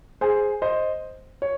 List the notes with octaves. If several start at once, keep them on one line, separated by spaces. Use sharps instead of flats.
G#4 C5
C5 D#5
C#5